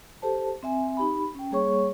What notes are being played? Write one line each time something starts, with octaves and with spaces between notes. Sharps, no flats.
G4 A4 C5 A5
C4 E5 G#5
D#4 G4 B5
C#4 G5
G3 A#3 G#4 C#5 C#6